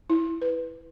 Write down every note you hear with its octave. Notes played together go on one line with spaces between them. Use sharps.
E4
B4